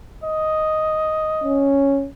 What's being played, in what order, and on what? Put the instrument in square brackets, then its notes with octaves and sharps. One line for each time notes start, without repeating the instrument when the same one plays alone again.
[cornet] D#5
[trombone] C#4